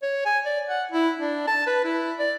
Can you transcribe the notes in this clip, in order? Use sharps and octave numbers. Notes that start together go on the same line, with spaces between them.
C#5
G#5
D5
F#5
E4
D4
A5
B4
E4
D5